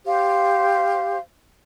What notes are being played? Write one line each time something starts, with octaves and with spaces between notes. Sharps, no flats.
G4 C5 F5